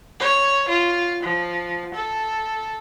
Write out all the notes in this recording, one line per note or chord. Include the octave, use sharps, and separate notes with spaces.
C#5
F4
F3
A4